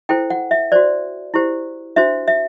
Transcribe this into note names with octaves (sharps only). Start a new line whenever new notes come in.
E4 A4 C5 G5
F#5
E5
F#4 C5 D5
E4 G4 C5
D4 F#4 C5 E5
E5